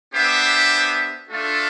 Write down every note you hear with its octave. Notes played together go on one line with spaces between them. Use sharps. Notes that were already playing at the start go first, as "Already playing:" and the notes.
B3 D4 G4 C5 E5
A3 D4 F4 A4